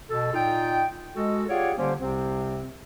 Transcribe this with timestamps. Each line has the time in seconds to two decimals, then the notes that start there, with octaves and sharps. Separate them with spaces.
0.09 B2 A4
0.33 A#2 D#4 F4 G5
1.16 G#3 F#4 A4
1.49 F4 G4 G#4 C#5 D5 F#5
1.77 D3 G3 A#3 C#4 G4 C5
2.00 C2 C3 C4